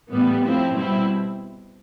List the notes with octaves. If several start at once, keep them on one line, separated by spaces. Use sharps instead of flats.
A2 E3 G3 B3
A2 F3 C4 E4
B2 G3 C4 E4